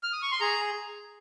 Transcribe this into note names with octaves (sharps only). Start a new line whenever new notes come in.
F6
D#6
C#6
C6
G#4 A#5